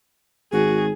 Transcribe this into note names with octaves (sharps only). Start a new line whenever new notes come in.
G#1 F#4 G#4